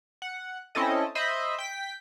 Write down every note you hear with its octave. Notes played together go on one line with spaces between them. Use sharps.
F#5
C4 C#4 E4 A4 D#5
C5 D#5 E5 B5
G5 B6